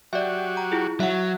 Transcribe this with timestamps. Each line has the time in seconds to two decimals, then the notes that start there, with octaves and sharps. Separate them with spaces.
0.13 F#3 F#4 G4 D5 E5
0.57 A#5
0.72 E4 F4 G#4
1.00 F#3 E5 F#5